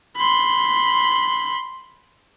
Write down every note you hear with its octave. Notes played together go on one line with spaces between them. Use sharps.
B5 C6